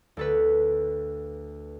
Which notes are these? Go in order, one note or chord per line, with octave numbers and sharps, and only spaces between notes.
D2 A4 B4